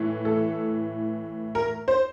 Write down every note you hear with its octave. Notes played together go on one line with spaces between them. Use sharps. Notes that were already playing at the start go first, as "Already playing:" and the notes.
Already playing: A2 E3
A4
A#4
C5